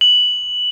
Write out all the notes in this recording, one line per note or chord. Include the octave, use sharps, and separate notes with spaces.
F#7